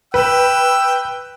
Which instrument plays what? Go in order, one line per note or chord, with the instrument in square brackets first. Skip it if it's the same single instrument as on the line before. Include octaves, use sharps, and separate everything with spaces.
[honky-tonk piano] B4 [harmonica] G5 E6